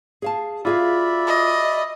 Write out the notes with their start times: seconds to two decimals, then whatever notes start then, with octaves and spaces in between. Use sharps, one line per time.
0.22 G#4 F5 A5
0.65 F4 F#4 G#4 D5 E5 F5 B5
1.27 D#5